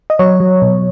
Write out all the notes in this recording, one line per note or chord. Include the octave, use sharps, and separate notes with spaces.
D#5
F#3 C#5
F#3
B2